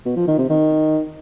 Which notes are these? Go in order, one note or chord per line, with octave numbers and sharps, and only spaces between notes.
B2
F3
D#3
C3
D#3